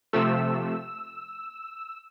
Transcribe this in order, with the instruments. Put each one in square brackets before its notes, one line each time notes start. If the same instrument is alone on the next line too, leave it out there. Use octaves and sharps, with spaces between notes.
[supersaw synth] C3 F3 A3 E6